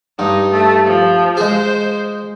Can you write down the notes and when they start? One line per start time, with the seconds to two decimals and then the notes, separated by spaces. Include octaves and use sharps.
0.19 G2 D#4
0.52 A3
0.85 F3
1.37 G#3 G#4 C5